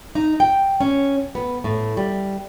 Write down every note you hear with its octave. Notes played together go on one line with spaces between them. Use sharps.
D#4
G5
C#4
B3
A2
G3